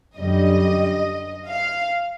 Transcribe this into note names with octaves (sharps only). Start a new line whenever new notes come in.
F#2 D3 G3 D#5
F5